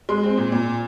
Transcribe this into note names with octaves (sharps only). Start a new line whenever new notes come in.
G#3 C6
C4
A#2
A#2